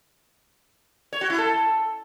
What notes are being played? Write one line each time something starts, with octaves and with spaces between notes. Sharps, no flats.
C#5
F#4
E4
A4